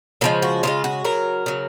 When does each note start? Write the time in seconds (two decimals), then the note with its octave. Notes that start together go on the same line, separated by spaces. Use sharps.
0.21 C#3 F3 G#3 A#3
0.42 F#4
0.63 C#3 F3 G#3 F4
0.84 F#4
1.05 C#3 F#3 A#4
1.46 C#3 F#3